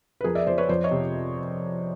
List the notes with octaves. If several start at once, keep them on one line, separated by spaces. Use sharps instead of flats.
B4
F2 G#4 A#4
D5 E5
F2 C5 D5
B4 C#5
F2 C5 D5
C#5 D#5
C3